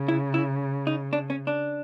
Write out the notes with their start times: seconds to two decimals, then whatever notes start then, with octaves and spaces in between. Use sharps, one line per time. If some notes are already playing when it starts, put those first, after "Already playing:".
Already playing: C#3
0.08 E4
0.34 E4
0.87 D#4
1.13 D4
1.30 C#4
1.47 D4